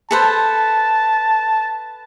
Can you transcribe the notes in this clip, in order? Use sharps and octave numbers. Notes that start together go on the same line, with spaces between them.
A4 B4 C5 A5